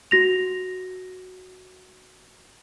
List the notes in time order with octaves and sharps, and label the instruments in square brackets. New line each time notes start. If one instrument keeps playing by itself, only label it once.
[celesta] F#4 A#6 F7